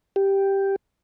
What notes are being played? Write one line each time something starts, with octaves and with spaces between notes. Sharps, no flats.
G4